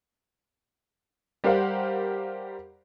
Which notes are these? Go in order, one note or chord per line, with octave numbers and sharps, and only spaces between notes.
G3 G4 A#4 C5 F5 F#5